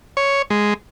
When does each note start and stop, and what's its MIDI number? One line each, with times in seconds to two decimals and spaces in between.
0.17 0.42 73
0.50 0.74 56